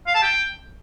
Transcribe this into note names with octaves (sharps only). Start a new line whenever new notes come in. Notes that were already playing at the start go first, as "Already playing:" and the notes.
F5
A5
G5